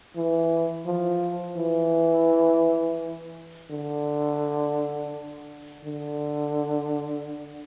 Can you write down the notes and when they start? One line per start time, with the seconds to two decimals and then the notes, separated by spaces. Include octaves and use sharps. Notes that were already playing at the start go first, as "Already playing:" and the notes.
0.16 E3
0.86 F3
1.57 E3
3.70 D3
5.84 D3